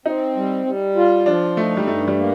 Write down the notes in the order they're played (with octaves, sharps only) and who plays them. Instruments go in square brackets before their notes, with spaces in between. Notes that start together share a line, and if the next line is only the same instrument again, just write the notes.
[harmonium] C4 [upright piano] D#4
[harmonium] G3
G3
F4
[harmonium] F3 [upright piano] D4
[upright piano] A3 [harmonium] D#4
[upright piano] G3
[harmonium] G2 [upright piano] A3
[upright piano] G3
[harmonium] A#3